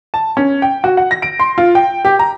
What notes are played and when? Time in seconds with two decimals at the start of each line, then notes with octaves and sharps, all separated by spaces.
0.14 A5
0.37 C#4
0.62 G5
0.84 F#4
0.97 F#5
1.11 A#6
1.22 D7
1.40 C6
1.58 F4
1.75 G5
2.05 G4
2.19 A#5